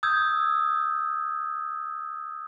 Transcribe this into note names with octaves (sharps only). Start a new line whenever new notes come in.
D#6 E6 G6 G#6